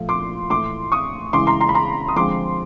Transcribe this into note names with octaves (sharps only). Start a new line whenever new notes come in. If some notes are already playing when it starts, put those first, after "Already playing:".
Already playing: A#2 F3 A3
C6 D6
A2 E3 A3 C6 D6
C#6 D#6
C#3 E3 G#3 C6 D6
A#5 C6
A#5 C6
B5
A#5 C6
D#6
D3 F3 G#3 C4 C6 D6